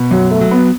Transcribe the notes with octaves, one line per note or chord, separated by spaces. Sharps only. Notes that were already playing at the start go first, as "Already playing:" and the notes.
Already playing: B2
F#2 F#3
A3
F#3
B3